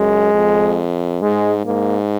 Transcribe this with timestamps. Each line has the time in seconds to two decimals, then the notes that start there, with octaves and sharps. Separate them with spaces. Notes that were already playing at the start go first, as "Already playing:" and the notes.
Already playing: F#2 G#3
0.34 F2
1.21 G#2 G#3
1.65 G#2 A#3